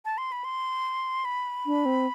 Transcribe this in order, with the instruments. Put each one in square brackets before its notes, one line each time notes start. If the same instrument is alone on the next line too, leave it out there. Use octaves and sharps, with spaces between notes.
[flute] A5
C6
B5
C6
B5
[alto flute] D4
C4